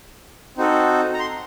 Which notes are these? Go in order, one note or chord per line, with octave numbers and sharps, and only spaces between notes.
C4 D#4 F#4 A4
A#5
C6